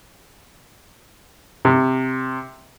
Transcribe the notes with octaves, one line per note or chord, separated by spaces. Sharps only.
C3